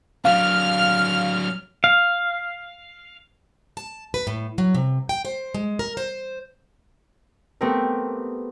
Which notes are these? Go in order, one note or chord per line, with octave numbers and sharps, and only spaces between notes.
F#3 D4 F5 F6
F5
A5
B4
A2
F#3
C3
G5
C5
G#3
A#4
C5
A3 B3 C4 G4 A#4